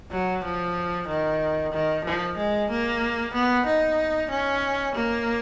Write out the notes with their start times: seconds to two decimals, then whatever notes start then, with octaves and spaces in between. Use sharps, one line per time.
0.11 F#3
0.44 F3
1.08 D#3
1.73 D#3
2.05 F3
2.37 G#3
2.70 A#3
3.34 B3
3.67 D#4
4.31 C#4
4.95 A#3